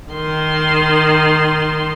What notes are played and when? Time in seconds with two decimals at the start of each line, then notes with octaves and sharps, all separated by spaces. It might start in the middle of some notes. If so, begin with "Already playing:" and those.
0.13 D#3 C6